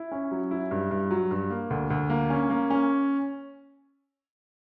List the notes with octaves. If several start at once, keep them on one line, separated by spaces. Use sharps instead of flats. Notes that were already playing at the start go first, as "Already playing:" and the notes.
Already playing: E4
C#4
F#3
E4
G2
G2
F#3
G2
A#3
D2
D2
A#3
C#4
A#3
C#4